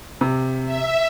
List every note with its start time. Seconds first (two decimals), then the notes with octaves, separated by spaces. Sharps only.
0.21 C3
0.65 E5